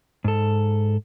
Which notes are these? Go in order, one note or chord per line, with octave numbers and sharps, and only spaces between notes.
G#2 A4